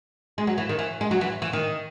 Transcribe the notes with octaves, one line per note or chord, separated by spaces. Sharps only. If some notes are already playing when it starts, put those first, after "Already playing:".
G#3
F#3
E3
D#3
E3
G#3
F#3
E3
E3
D#3